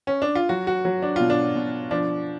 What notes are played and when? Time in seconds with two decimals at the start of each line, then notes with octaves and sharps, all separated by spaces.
0.07 C#4
0.22 D4
0.35 F4
0.49 F#3 F#4
0.67 F#4
0.85 F#3
1.02 D4
1.16 B2 F4
1.30 D4
1.55 B2
1.91 F3 D4